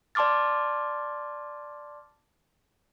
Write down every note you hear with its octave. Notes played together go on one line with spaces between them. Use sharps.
D5 A5 C6 D6 F6 A6